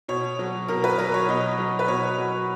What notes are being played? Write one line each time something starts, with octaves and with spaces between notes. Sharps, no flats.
B2 C#5
F#3
B2 A#4
B4
F#3 A#4
C#5
B2 D#5
F#3
B4
B2 C#5
F#3